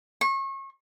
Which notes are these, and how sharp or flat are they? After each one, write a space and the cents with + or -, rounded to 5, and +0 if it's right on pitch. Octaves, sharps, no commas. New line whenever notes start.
C#6 -35